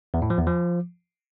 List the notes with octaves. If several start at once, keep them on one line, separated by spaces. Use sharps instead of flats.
E2
A2
F3
E2
F3